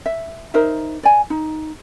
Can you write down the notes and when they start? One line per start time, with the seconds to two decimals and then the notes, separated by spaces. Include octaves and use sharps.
0.06 E5
0.54 D#4 A#4 C5 E5
1.03 D5 G#5
1.30 D#4